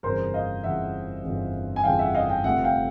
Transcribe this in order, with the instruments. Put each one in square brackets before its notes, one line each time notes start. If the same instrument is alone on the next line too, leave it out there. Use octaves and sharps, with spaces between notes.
[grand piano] G1 F2 C#3 E3 A#4 C5
D#5 F5
G1 F2 C#3 E3 E5 F#5
G1 F2 C#3 E3
G#5
G1 F2 C#3 E3 F5 G5
E5 F#5
D#5 F5
F5 G5
F1 F2 D3 F3 E5 F#5
F5 G5